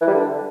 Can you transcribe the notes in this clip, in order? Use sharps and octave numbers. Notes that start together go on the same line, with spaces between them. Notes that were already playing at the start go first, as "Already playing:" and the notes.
E3
G3
D3